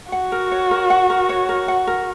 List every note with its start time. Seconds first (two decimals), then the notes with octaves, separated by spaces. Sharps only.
0.12 F#4 F#5
0.32 A#4
0.51 C#5
0.71 A#4
0.90 F#5
1.10 A#4
1.29 C#5
1.49 A#4
1.68 F#5
1.87 A#4